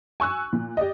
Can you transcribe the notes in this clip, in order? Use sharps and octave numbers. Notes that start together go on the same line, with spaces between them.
G#5 C#6 E6 F#6
A#2
G4 D5 D#5